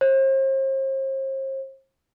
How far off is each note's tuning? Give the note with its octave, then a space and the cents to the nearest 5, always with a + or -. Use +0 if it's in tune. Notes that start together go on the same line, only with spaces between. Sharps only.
C5 +40